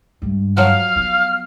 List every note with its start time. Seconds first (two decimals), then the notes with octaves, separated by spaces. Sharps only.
0.22 G2 G#3
0.57 F3 F#3 F5 F6
0.96 B3